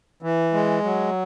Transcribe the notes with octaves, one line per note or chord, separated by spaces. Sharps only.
E3
G#3
F#3